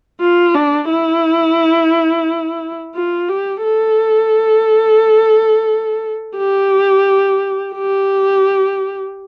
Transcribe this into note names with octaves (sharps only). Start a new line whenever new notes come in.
F4
D4
E4
F4
G4
A4
G4
G4